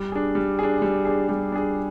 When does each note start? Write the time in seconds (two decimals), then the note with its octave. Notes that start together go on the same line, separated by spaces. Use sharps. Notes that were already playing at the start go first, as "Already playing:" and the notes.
Already playing: G3
0.12 D4 G#4
0.35 G3
0.59 D4 G#4
0.82 G3
1.05 D4 G#4
1.29 G3
1.52 D4 G#4